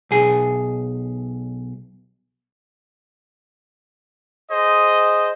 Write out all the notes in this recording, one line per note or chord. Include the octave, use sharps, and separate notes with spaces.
B1 G#4
G#4 C5 D#5